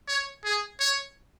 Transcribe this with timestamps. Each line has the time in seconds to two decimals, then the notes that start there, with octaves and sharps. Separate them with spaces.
0.08 C#5
0.45 G#4
0.80 C#5